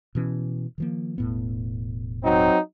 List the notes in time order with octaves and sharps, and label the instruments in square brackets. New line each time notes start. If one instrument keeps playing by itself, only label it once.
[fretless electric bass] B2 E3 C#4
D#3 F3 A#3
E1 A2 B3
[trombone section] F#3 C4 D#4